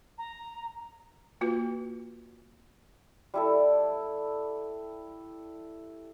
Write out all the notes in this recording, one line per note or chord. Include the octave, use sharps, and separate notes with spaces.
A#5
A#3 F4 F#4 B4
G3 E4 A4